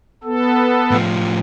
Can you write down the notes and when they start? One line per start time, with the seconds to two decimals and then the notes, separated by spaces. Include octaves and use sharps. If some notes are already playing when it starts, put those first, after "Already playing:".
0.24 B3 A4
0.91 A2 F3